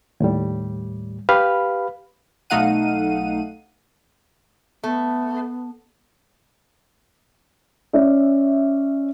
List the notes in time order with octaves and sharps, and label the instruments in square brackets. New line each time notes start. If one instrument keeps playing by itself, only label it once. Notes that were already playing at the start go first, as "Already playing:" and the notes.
[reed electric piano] D#2 A2 G3
G4 B4 F5 B5 F6
[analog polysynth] B1 A3 D#4 F5 F#5 D#7
[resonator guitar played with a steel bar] A3 [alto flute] B3
[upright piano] C#4 D5 E5